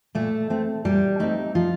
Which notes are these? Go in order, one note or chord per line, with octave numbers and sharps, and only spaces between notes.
A#2 A3 A4
A3 C4
A#2 G3 G4
A3 C4 D#4
F3 F4